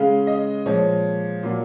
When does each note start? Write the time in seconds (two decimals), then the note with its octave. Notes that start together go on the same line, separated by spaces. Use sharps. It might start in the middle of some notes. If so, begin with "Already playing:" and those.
Already playing: C#3 G#3 F5
0.27 D#5
0.66 A#2 F3 G#3 C#5
1.43 A#2 F#3 A#3